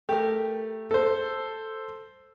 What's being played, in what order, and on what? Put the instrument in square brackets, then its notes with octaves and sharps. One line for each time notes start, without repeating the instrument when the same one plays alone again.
[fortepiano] A3 [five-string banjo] G4 A#4
[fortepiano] A4 C5